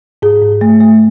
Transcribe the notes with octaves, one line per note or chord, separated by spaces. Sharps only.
G#2 G#4
G#2
A3
A3